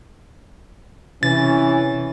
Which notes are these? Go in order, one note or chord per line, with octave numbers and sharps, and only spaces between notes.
C3 E3 C#4 A6